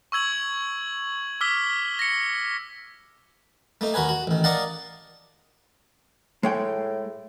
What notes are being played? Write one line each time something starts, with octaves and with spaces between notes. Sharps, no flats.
C#6 E6 G#6 F#7
D6 E6 F6 B6 G7
A#6 C#7
A3 A#3 D#4
D#2 F#4 A#4 B4 G#5
F#4
A1 D#3
A#4 D5 D#5 F5 F#5 A5
A2 G#3 C#5 G5